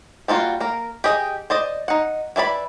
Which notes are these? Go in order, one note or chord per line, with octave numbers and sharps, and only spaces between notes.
G3 A#3 F4 F#4
A#3 A#4
G4 G#4 D#5
C5 D5 D#5
D#4 F#5
E3 E4 D5 B5